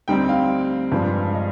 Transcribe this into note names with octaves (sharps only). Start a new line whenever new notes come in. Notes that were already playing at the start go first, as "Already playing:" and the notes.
D2 D3 G3 C4 D#4 G5
F5
G2 F3 G#3 D4
D#5